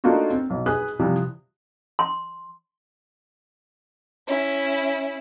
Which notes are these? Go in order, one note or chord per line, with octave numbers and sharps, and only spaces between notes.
A3 A#3 D4 D#4 F4 F#4
C4
B1
G#4 B4 D#6 F#6
C3 E3 F3 G3
C6
C#4 E4